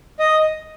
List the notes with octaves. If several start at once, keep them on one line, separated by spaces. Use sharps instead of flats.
D#5